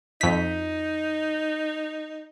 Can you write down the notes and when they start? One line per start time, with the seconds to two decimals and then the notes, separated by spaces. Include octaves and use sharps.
0.21 F2 D#4 B6